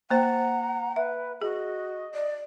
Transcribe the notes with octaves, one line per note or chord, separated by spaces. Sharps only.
A#3 C5 F#5 G5 A#5
B4 E5
F#4 G#4 D#5
D5